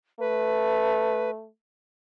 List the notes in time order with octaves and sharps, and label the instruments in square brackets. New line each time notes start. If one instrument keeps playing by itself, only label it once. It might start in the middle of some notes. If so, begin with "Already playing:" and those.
[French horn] A3 [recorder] B4